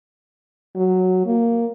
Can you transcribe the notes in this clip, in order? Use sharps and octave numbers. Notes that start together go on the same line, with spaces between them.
F#3
A#3